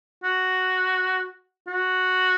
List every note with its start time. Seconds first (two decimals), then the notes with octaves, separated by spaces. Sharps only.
0.23 F#4
1.68 F#4